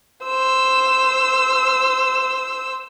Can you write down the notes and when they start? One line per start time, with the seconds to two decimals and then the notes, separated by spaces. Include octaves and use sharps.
0.24 C5 E6